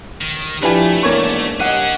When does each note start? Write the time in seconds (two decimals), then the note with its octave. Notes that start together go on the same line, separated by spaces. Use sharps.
0.21 D#3
0.63 F3 A3 D4 E4 G4 B4 G#5
1.03 E2 G#2 A#3 C#5 C#6
1.60 G3 C#4 G#4 D#5 F#5